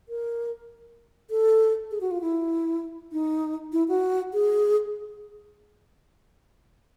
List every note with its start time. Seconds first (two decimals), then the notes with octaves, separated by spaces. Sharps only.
0.09 A#4
1.30 A4
1.91 G#4
2.01 F#4
2.11 F4
2.21 E4
3.12 D#4
3.73 E4
3.88 F#4
4.34 G#4